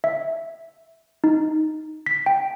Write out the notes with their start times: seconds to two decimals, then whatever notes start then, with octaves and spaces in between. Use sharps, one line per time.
0.04 E5
1.24 D#4
2.06 B6
2.26 G5